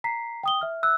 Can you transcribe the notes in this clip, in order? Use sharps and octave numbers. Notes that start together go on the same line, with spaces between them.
A#5 B6 C7
G5 D#6 G7
E5 F6
E6 F#6